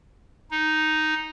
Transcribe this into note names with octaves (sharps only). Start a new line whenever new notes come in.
D#4